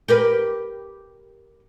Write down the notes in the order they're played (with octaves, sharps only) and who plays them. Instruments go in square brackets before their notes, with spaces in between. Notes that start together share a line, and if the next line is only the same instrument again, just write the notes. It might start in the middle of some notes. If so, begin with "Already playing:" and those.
[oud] G4 A#4 B4